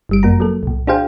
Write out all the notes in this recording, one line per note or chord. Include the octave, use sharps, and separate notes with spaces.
G1 G3 D7
F#2 A#3 F#4 A#5
F#3 A#3 A4
C2 A#2
D4 F#4 G#4 C5 F5 G5